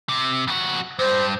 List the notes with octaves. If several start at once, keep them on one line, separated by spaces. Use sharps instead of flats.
C3
F2 F#4
G2 C5